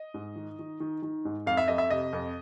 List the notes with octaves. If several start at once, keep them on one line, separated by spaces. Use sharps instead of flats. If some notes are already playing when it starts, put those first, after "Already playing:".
Already playing: D#5
G#2
D#3
D#3
D#3
D#3
G#2
F2 F5
E5
F2 D#5
E5
C3 D#5
F2